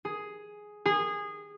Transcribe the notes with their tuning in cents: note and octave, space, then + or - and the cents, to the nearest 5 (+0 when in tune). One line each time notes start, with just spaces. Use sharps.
G#4 +5
G#4 -20